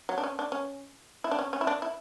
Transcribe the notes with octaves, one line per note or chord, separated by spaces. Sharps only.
F#3
D4
C#4
D4
C#4
E4
D4
C#4
C#4
E4
D4
E4